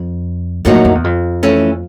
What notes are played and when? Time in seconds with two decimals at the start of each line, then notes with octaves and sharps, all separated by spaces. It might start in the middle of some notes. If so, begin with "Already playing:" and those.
Already playing: F2
0.65 F#2 A2 F#3 A#3 D#4 F#4
0.75 F#2
0.85 F2
0.95 E2
1.04 F2
1.43 E3 A3 C#4